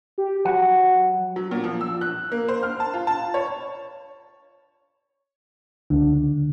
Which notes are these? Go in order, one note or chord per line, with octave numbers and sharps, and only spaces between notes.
G4
F#3 F#5
F#3
A#2
F3
E6
F#6
A#3
C5
F6
A5
F4
A5
C#5
C#2 D3